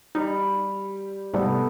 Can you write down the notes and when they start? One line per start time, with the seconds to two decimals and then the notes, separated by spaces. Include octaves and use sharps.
0.15 G3 D#4
1.34 G#2 C3 G3 A3 B3